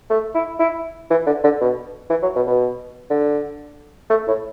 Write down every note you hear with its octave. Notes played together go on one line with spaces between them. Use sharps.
A3
E4
E4
E3
D3
D3
B2
E3
F#3
B2
B2
D3
A3
A2